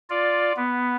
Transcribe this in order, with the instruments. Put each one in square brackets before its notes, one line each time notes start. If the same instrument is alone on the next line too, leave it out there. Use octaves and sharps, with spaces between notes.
[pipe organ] F4 D5
B3